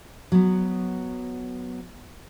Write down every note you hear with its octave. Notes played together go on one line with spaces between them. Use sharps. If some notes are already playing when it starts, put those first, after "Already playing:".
F#3 B3